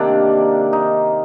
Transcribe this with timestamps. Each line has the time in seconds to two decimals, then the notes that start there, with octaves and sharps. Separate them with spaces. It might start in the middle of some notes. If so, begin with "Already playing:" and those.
Already playing: C3 D#3 A#3 D4
0.73 D#4